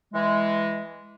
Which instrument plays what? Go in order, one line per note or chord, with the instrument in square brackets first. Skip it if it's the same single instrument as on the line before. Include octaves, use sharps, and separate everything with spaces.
[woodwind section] E3 G#3